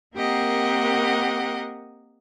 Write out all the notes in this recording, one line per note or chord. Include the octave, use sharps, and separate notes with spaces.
A#3 C4 G4 A#4 D#5 F#5